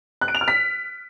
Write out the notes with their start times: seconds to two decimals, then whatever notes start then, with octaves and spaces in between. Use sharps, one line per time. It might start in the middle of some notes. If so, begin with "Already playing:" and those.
0.21 F#6
0.28 D7
0.35 F7
0.41 F6
0.48 B6